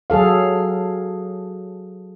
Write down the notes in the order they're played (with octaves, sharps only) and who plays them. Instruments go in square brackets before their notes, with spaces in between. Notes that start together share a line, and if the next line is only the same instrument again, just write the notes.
[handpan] F#3 G#4 A4 F5